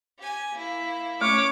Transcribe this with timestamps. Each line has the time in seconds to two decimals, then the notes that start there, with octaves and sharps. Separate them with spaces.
0.18 G4 G#5
0.53 A#3 E4
1.21 A3 C#4 C#5 D6